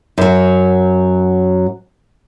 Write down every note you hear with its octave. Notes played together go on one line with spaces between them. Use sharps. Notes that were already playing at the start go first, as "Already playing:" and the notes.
F#2 F#3